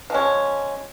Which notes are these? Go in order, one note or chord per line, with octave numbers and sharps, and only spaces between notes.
F3 G#3 C#4